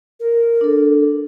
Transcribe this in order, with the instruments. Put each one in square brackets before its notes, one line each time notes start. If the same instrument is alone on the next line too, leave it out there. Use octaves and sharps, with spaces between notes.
[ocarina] A#4
[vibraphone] D4 A4